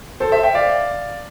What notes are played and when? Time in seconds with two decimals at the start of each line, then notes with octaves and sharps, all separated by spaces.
0.20 A4 C5
0.32 C5 E5
0.43 E5 G5
0.54 D5 F5